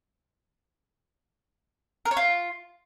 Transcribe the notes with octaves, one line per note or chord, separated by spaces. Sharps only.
A#4
C#5
F4